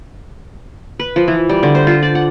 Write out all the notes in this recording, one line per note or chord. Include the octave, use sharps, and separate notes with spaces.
B4
F3
E3
G3
D3
C5
F4
D5
F#5